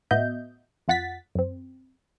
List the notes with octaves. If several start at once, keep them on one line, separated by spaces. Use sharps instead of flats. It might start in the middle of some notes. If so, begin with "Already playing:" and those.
A2 B3 F#4 D#5 E5 G6
F2 F4 F#5 A6 B6
F#2 C4